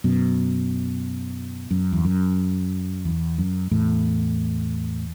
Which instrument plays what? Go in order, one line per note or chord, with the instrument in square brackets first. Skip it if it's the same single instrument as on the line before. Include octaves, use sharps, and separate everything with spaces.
[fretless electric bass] F#2 B2
F#2
E2
F#2
E2
F#2
E2 A2